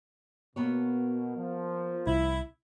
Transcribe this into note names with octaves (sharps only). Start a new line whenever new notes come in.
B2 A#3 B3 C#5
F3
C2 E4